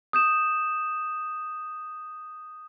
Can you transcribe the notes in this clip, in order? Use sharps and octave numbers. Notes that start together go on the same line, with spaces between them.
D#6 G6 E7